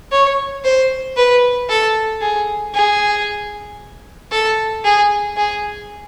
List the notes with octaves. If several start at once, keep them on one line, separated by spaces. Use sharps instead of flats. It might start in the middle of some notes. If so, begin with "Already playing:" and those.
C#5
C5
B4
A4
G#4
G#4
A4
G#4
G#4